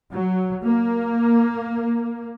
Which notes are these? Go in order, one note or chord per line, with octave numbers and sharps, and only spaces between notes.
F#3
A#3